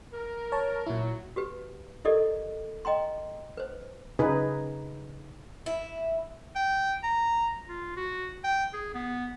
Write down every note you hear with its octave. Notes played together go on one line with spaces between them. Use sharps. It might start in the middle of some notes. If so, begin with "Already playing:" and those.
A#4
C#5 A5
A#2 F#3 E4
F#4 G4 B4
E4 G4 A4 A#4 D5 D#5
D#5 G5 A#5 C6
B4 C5
C#3 D#4 G#4 B4
E4
G5
A#5
F4
F#4
G5
G#4
B3